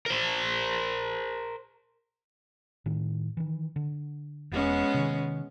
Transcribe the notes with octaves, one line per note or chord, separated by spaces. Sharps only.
A#4 C5
A2 D#3
D#3 E3
D3
E1 G#3 B3 C#4
C3 D#3